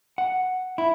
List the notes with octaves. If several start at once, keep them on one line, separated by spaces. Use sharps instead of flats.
F#5
E4